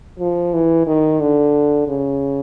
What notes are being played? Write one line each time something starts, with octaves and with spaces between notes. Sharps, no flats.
F3
E3
D#3
D3
C#3